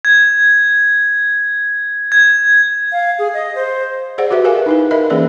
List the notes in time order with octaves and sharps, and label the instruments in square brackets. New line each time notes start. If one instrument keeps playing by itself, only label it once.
[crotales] G#6
G#6
[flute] F5
G#4
D#5
C5
[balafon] G#4 C5 D5 F#5
F#4 G4 B4 E5
G#4 A#4 B4 F5 F#5 G#5
D#4 E4 B4
A#4 D#5 E5 B5
E3 A#3 C#4 G#4 B4 D5